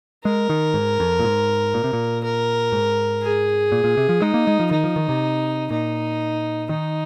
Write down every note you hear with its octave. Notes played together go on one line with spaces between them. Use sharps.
G#3 A#4
D#3
G#2
F2
A#2
G#2
A#2
C3
A#2
A#4
G#2
G#4
A#2
A#2
C3
F3
G#3 D#4
A#3
G#3
F3
D#3 D#4
F3
D#3
C3
A#2 D#4
D#3 D#4